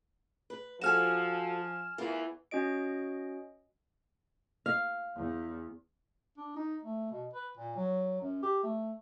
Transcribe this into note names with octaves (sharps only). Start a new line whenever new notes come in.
B4
F3 F#4 A4 G#5 F6 E7
E2 E3 F4 A#4
C#4 F#4 D#5 D7
F5
E2
D4
D#4
A3
B2
B4
A#2
F#3
F#2
G4
A3